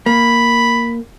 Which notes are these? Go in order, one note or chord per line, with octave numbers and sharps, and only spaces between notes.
A#3 B5